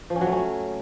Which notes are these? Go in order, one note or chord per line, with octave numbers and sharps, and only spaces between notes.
F3
C#4
F#3
A3
C#4